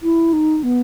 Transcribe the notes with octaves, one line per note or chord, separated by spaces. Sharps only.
E4
D#4
B3